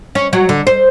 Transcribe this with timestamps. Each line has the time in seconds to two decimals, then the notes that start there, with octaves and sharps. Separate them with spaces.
0.15 C#4
0.33 F#3
0.49 D3
0.67 C5